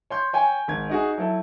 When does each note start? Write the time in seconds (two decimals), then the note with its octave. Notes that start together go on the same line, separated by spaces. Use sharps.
0.10 C#5 C6 G6
0.33 C#5 G5 G#5
0.68 G#1 G#6
0.89 D#4 F#4 G#4
1.18 F#3 E4 A4